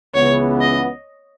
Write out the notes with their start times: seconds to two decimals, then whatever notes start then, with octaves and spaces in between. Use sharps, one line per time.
0.14 C#2 C#3 E3 B3 C#5
0.61 D#5